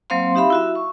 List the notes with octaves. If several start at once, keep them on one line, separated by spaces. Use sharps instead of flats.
F#3 A#3 C4 C5 F5 C6
D#4 G4 E5 F5 B5
E4 F#4 E5
C#6